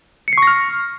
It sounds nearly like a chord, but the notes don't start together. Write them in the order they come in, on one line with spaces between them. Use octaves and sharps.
C#7 C7 C#6 A#6 F6